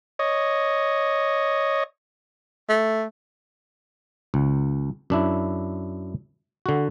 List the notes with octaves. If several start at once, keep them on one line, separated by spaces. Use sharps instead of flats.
C#5 D#5
A3
C#2
F#2 D4 E4
D3 F#4